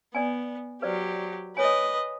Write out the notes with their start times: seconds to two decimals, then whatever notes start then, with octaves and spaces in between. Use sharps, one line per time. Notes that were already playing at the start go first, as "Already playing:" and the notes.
0.15 B3 D5 G#5
0.82 F#3 G4 B4 C5 D5
1.57 B4 C#5 D#5 G#5